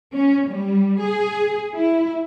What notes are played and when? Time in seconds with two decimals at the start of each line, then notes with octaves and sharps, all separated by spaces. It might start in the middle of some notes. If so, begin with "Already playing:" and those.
0.15 C#4
0.51 G3
1.04 G#4
1.75 E4